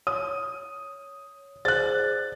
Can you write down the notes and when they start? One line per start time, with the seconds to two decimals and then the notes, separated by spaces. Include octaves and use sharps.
0.07 C#5 D#6
1.65 G#4 C5 D5 F#6 A6